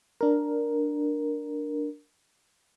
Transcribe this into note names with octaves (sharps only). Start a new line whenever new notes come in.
D4 A#4